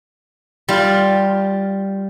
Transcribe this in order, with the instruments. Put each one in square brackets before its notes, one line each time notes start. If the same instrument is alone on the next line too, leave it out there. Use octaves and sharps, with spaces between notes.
[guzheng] G3 F4